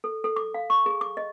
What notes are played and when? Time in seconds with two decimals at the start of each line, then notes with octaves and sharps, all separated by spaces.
0.04 A4
0.24 A4
0.36 D6
0.54 F5
0.70 C#6
0.86 G#4
1.01 D6
1.17 D#5